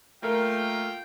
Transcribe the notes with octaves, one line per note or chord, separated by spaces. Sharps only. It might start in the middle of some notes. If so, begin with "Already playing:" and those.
A#2 A3 A#4 F5 G5